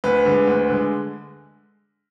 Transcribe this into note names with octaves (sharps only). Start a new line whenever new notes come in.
D2 B4
D3 G#3
D2
D3 G#3